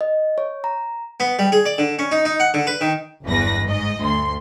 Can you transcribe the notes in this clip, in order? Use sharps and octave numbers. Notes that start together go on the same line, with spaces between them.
D#5
C#5
A#5
B3
G3
G#4
D5
D3
C#4
D#4
D#4
F#5
D3
B4
D#3
G1 E2 B4 A#6
G#2 D#5
D2 C6